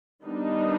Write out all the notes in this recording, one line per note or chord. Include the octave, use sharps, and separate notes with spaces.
D#3 G3 B3 D4 D#4